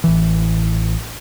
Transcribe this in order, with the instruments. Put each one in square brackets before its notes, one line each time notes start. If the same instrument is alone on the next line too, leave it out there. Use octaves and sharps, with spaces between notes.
[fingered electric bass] A1 E3